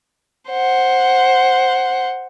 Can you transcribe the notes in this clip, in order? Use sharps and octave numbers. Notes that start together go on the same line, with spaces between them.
C5 F#5